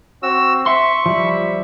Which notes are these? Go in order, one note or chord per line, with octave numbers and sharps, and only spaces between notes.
C4 F#4 E6
E5 C6 C#6
F3 G3 E5 B5